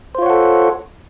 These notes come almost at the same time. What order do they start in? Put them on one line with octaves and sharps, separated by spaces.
C5 F4 C#5 F#5 A4